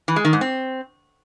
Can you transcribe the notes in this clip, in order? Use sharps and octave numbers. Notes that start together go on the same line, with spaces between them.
E3
G#3
D#3
G#2
C4